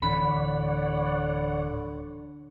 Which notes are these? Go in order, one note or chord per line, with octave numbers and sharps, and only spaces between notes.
D1 D3 E3 C4 C#5 D5 F#5 B5